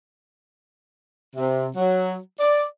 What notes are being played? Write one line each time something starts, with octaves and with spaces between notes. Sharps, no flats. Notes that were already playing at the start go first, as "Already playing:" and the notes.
C3
F#3
D5